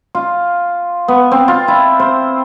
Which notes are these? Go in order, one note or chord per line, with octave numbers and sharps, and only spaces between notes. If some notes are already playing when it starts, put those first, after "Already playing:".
F4
B3
C4
F4
E4
C5